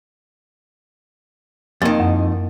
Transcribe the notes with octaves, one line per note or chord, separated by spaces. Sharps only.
F2 D#3 A#3
F#2